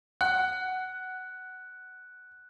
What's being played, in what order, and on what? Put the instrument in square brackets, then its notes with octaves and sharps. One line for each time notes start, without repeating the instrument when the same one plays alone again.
[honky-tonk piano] F#5 [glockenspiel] F#6